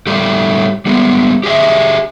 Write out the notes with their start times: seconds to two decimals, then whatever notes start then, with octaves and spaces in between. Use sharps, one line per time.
0.07 A2 G3 A3 G4
0.86 G3 G#3 B3
1.44 G4 G#4 A#4 D#5 E5